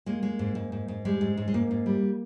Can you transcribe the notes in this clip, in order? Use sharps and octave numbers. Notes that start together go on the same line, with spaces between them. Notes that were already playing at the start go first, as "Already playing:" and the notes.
G#3 A#3
G#3
G#2
G#2
G#2
G#2
G3 G#3
G#2
G#2
G#3
G#2 A#3
G#2
G3